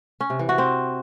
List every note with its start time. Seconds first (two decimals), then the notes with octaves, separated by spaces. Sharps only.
0.21 C#4
0.30 C3
0.39 E3
0.49 F#4
0.58 C4